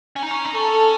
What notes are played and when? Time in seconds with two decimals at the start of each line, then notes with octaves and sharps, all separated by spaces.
0.16 C#4
0.23 D#4
0.31 C#4
0.45 D#4
0.55 C#4 A4